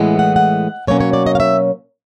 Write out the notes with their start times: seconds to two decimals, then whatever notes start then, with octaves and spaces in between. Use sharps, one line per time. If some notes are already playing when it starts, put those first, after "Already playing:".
Already playing: A2 E3 G#3 B3
0.19 F#5
0.36 F#5
0.87 B2 F#3 A#3 C#4 C#5
1.00 C#5
1.13 D5
1.26 D#5
1.35 F5
1.40 E5